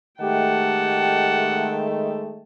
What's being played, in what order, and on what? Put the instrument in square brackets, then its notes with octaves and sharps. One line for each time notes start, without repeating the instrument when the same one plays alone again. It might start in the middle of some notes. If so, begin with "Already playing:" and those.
[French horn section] D#3 G#3 A3 [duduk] G4 [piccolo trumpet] F#5 [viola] G5 A5